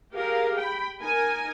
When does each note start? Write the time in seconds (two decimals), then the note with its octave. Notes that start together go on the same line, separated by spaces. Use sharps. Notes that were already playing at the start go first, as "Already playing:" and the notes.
0.13 G4 G#4 A#4 F5
0.58 G5 B5
1.01 D#4 A#4 G#5